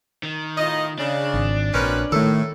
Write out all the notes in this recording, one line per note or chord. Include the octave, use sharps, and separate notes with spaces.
D#3
A2 D#4 F4 D#5
C#3 D4
G#1
A#1 C4 C#4 F#4 A#4 B4
A2 D#3 A3 A4